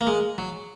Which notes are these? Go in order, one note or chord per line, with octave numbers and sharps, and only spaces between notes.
A#3
G#3
F#3